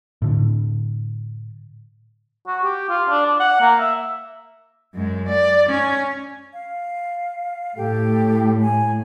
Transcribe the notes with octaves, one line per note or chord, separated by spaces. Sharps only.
A2 D3
F#4
G4
F4
D4
D5
F#5
A#3
E5
F#2 G#3
D5
C#4
F5
A2 G4 A4 G5
G#5